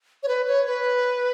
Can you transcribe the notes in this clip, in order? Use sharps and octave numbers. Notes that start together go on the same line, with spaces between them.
C#5
B4
C#5
B4